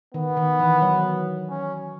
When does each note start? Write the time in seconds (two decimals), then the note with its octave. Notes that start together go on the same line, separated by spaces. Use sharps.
0.14 D#3 B3
0.37 D#3
0.59 E3
0.82 F#3
1.50 C#4